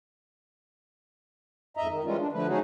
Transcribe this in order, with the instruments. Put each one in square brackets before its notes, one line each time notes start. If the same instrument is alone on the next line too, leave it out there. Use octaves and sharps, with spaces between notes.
[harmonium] F2 G#2 D#5 E5 A#5
D#3
E3 G3 G#3 C#4 F4
D4
D3 F3 A3 B4
F#3 A3 C#4 D#4 F#4 G#4